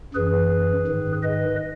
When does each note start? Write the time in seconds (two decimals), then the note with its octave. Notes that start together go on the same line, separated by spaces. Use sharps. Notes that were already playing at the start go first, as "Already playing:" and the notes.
0.14 F#2 E3 G#4 B4
0.87 G#2 D#3
1.23 B4 D#5